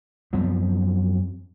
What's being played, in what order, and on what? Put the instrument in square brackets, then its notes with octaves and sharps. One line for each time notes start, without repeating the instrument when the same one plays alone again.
[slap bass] F#2 F3 B3 C4